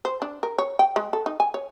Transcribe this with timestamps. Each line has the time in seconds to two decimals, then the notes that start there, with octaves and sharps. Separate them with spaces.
0.05 C5
0.22 D4
0.43 A#4
0.58 C#5
0.79 G5
0.96 G#3
1.13 A4
1.26 D#4
1.40 G#5
1.54 C#5